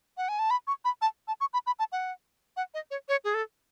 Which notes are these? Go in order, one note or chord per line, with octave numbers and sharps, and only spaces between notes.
F#5
G#5
A5
B5
C#6
B5
A5
A5
C#6
B5
B5
A5
F#5
F#5
D#5
C#5
C#5
G#4
A4